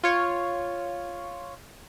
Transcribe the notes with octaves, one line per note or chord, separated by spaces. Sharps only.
F4 C#5